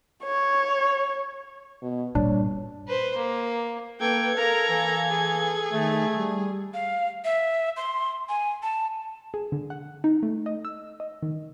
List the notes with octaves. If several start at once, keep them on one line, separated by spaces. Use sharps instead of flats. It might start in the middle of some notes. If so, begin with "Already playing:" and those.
C#5
B2
G2 A#2 G3 D4 C#5
B4 C5
A#3
A#3 A4 B4 G5 G#6
A#4 F5 A#5
E3
G#4
D#3 A3
G3
F5
E5
C6
G#5
A5
G#4
D3
F#5
D#4
A3
D#5
E6
D#5
D#3